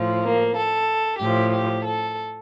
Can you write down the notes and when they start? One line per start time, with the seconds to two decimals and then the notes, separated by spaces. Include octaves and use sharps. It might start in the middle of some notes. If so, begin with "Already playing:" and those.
Already playing: A2 F3
0.22 A#3
0.55 A4
1.20 A2 F3 G4
1.53 G4
1.85 A4